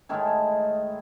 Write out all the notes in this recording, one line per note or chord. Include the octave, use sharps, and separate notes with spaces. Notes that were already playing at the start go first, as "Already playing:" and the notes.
A2 D#3 G#3 E4